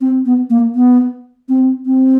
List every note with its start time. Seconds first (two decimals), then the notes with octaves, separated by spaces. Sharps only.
0.01 C4
0.26 B3
0.50 A#3
0.75 B3
1.49 C4
1.86 C4